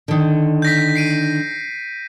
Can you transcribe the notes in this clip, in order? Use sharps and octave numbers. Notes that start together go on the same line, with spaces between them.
D3 D#3
G6 A#6 B6
C7 D7 D#7